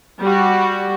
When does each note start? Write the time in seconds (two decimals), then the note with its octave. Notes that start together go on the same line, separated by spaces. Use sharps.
0.21 G3 F#4